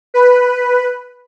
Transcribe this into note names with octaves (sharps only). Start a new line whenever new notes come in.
B4